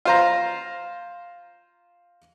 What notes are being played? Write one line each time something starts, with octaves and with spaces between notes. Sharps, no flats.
F4 C5 A#5